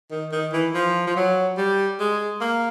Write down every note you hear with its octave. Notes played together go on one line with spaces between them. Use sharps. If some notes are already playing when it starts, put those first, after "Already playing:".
D#3
D#3
E3
F3
F3
F#3
G3
G#3
A#3